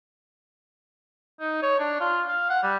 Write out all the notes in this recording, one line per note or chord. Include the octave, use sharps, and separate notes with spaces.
D#4
C#5
D4
F4
F5
F#5
G3